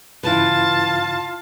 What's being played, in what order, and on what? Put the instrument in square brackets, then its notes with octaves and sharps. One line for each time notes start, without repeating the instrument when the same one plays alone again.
[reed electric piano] G2 C#3 E4 [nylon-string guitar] E3 B4 [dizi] F4 [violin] A5